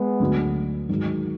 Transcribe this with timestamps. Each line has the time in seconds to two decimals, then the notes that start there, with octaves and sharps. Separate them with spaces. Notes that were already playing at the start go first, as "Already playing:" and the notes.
Already playing: G#3 B3
0.20 D2 D3 F#3
0.89 G#2 D#3 F#3